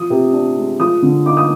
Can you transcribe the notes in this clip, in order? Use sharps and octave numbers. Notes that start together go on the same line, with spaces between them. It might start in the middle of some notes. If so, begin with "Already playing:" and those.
Already playing: F3 D#6
C3
D4
G#3
F3 D#6
D3
D#4 D6
D#6